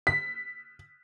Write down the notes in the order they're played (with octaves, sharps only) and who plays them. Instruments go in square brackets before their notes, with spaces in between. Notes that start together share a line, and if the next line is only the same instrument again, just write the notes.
[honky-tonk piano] B6